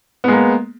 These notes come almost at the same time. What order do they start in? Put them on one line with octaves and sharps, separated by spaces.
B3 G#3 A#3